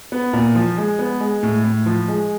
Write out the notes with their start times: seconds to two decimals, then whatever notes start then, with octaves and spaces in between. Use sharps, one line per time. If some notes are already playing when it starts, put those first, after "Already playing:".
0.12 B3
0.33 A#2
0.55 F3
0.77 G#3
0.99 B3
1.20 G#3
1.43 A2
1.64 A2
1.86 F3
2.08 G#3